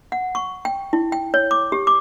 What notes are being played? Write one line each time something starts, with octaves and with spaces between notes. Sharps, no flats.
F#5
C#6
G5
E4
G5
C#5
D6
G4
D6